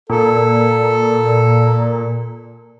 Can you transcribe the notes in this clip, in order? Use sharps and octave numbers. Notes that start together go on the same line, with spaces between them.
A#2 A4